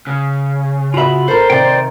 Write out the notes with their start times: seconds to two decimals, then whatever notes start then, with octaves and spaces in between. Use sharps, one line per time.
0.07 C#3
0.94 F4 F#4 E5 B5
1.28 A4 A#4 C5
1.50 C3 D#3 D5 G5